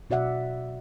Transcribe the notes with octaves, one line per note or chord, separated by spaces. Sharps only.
B2 F#4 D5 E5 F#5